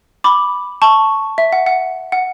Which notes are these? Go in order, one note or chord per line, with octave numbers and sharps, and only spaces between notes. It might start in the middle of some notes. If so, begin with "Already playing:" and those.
B5 D6
A5 C#6
E5
F#5
F#5
F#5